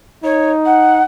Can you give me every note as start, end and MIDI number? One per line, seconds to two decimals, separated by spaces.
0.24 1.04 63
0.24 0.51 73
0.65 1.02 78